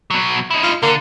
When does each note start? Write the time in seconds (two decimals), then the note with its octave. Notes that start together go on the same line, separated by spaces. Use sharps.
0.10 B2 F#3
0.51 D#4 E4
0.63 F4
0.83 D3 A#3